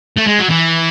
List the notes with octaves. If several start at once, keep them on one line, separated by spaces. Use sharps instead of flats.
A3
G#3
F#3
E3